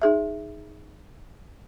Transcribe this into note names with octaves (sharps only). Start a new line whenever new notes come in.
D#4 G#4 E5